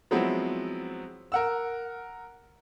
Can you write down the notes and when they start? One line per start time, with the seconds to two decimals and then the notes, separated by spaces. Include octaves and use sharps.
0.11 F3 F#3 G#3 B3 C4 E4
1.32 A#4 F#5 E6